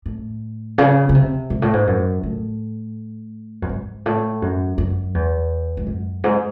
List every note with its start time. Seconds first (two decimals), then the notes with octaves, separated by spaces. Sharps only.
0.06 A2
0.78 C#3
1.09 C#3
1.15 C3
1.50 G#2
1.62 A2
1.73 G#2
1.87 F#2
2.23 A2
3.62 F#2
3.69 G#2
4.06 A2
4.42 F#2
4.78 F#2
5.14 E2
5.77 G#2
5.87 F#2
6.24 G#2